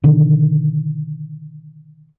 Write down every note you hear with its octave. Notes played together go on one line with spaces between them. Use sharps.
B2 D3 D#3